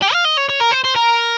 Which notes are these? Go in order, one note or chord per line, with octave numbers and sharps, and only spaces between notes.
G4
F5
D#5
C#5
C#5
A#4
C5
C5
A#4